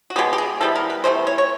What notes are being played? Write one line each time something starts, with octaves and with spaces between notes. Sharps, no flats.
F#4
B2 G#3 B3 G4
G4
G#4
C3 E3 G3 B3 A4
A#4
B4
C3 E3 A3 C5
C#5
C#5